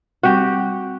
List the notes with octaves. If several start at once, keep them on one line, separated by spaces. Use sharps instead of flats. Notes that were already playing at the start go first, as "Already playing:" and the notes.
G3 C4 F#4 G4